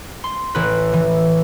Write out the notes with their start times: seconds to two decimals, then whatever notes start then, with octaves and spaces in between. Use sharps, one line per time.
0.24 C6
0.55 A1 B4
0.93 E3